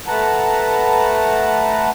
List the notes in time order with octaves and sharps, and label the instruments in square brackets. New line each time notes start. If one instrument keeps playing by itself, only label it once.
[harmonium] A3 B4 F#5 A5 A#5